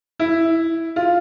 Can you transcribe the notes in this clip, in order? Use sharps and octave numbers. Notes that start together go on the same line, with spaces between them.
E4
F4